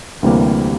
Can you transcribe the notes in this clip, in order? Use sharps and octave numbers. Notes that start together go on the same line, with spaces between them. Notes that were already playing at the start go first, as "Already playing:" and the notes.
D2 C3 E3 G3 A#3